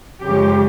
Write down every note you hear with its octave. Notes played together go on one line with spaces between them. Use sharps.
F#2 C#3 F3 G#3 G4